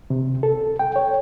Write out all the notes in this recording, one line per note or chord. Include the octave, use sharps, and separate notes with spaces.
C3
A4
G5
C#5